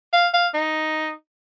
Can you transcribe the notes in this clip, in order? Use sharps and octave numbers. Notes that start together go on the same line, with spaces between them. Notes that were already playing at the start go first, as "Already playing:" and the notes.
F5
F5
D#4